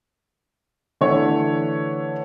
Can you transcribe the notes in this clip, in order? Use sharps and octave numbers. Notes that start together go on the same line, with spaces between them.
D3 E3 A3 C#5